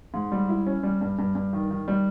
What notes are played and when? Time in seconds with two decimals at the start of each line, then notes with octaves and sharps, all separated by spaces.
0.14 G#2
0.32 G3
0.49 E4
0.67 C#4
0.83 G3
1.01 G2
1.19 G2
1.35 G2
1.53 D#3
1.70 D#3
1.88 G3